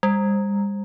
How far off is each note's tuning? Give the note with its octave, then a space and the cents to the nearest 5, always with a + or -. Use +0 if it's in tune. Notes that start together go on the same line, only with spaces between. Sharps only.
G3 +40